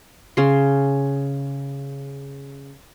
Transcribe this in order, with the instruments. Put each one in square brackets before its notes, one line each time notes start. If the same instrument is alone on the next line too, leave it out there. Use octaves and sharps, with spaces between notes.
[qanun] C#3 C6